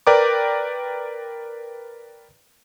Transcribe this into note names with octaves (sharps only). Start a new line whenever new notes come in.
A#4 B4 D5 G5 A#5 D6